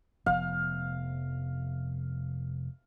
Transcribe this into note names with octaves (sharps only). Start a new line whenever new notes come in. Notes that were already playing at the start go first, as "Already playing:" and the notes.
F1 F3 B3 F5